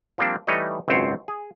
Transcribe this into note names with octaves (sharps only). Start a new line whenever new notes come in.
F3 G3 A#3 C4 D4
E3 G3 A3 D#4 C#5 D#5
G#1 C#2 F#2 C4 C5 C#5
G#4